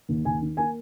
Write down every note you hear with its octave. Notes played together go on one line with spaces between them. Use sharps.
D#2
D#2 G#5
D#3
A#3 G#5